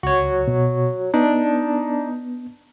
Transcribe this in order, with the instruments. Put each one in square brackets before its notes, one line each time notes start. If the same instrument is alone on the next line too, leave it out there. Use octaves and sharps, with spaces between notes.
[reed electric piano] C#2 [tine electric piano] F#4 C#5
[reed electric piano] B2
[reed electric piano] B3 [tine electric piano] D4 [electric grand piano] D#4